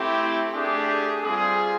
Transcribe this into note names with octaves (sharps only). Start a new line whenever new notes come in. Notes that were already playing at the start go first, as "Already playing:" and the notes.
Already playing: A3 C4 E4 G4
A3 D4 G4 G#4
G3 C4 F4 G#4